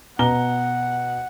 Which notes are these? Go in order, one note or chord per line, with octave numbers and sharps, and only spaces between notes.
B2 F#5 A#5 G7